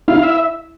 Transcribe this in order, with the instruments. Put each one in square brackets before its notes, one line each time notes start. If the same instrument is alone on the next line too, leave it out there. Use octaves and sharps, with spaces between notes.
[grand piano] E4 [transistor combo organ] F5
[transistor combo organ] E5